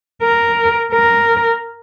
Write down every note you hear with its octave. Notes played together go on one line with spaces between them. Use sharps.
A#4
A#4